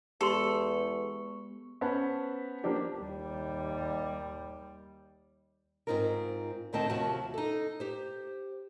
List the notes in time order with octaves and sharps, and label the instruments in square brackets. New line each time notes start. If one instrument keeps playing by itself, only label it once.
[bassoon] E2 [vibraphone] G#3 B3 C#6 [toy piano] G4 C6 [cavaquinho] A4
[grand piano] B3 C#4 B4 C5 A5 B5
F3 A#3 D4 G4
[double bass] D#2 G3
[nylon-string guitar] G#2 C3 C4 D#4 F4 A#4
D2 A2 D#3 C4 D#5 A5
D#2 C3 F3 F#4 A5
D#4 A4
G4 C5